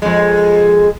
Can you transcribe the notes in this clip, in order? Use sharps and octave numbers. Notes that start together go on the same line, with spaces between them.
F2 G#3